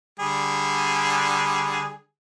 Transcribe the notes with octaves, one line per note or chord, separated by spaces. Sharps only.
D3 G3 G#4